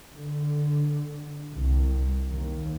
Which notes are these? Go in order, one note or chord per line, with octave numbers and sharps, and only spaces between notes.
D3
C2
D#2